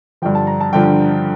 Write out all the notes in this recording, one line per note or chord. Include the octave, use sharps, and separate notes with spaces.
G2 D3 F3 G5
A5
A#5
A5
G2 D3 F3 G5